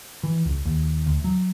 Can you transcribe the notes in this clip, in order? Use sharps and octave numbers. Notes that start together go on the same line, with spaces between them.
E3
C#2
D#2
D2
F#3